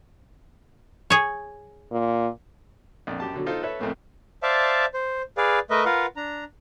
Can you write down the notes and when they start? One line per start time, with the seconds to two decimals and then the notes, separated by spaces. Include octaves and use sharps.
1.10 G#4 C#5
1.92 A#2
3.07 A#1 F2
3.20 F#2 G4 A5
3.34 B2 D3 F#3
3.46 D#4 F4 A4 C5
3.63 A4 B4 C#5 E5
3.80 F2 A2 A3 A#3
4.43 C5 D5 E5 F5 A5
4.94 C5
5.37 G#4 B4 D5 F5
5.70 A3 A#4 B4 D#5 E5
5.85 F4 A#4 B4 F5 F#5
6.16 D4 A#5